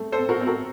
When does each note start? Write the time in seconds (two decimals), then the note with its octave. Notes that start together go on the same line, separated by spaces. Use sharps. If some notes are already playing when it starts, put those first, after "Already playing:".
Already playing: A3 C4
0.12 A4 C5
0.18 C4
0.29 F#4 A#4
0.41 C4
0.47 F#4 A#4